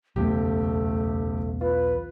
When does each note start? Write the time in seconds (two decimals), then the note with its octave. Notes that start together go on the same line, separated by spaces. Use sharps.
0.16 F#1 B1 E2 A3 G4
1.61 F4 B4